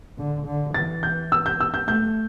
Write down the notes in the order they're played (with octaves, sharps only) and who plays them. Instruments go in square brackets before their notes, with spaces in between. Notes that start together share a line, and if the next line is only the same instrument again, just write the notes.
[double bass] D3
D3
[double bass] E3 [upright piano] A6
[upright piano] G6
E6
G6
E6
G6
[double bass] A3 [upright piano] G6